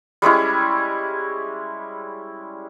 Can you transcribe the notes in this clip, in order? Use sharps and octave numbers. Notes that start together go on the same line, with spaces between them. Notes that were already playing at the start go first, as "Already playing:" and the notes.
G3 G#3 C#4 E4